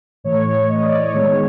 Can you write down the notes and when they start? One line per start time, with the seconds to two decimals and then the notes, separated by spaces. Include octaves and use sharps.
0.24 A2 E3 A3 C#5
0.46 C#5
0.68 D#5
0.83 D5
0.99 C#5
1.13 D#3 G#3 B3 C#5